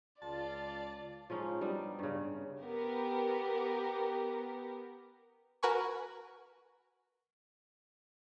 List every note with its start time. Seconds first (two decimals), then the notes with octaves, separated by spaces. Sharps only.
0.22 C#2 F4 D5 A5
1.30 F3 G#3 C#4 D#4
1.61 G3 B3 D4 D#4
1.99 G2 C#3
2.62 B3 G4 A#4
5.63 F#4 A#4 B4 G#5 C#6